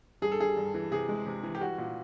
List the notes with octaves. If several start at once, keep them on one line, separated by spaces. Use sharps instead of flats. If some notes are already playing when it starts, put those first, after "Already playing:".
G2 G#4
A4
G3 G#4
G2
E3
C3 G#4
G#3
C3
E3
G4
G3 F#4
A#2